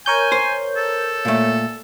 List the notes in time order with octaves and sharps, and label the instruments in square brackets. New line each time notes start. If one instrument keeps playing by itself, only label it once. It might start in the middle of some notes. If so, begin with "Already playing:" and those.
[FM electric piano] A#4 C#5 G6 [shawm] G#5
[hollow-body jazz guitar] C5
[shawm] A4
[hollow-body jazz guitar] A#2 A3